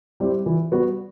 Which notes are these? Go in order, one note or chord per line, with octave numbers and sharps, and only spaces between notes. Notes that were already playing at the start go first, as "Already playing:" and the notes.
G3 C4 E4 G4
E3
G3 B3 F#4